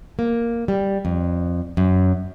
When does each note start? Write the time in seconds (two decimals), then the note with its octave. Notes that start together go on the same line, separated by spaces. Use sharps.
0.19 A#3
0.68 G3
1.05 F2
1.77 F#2